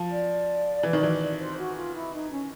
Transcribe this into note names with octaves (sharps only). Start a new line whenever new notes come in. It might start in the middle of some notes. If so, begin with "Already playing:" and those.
Already playing: F3
D5
E3
D#3
E3
C5
F#4
F4
E4
D#4
C#4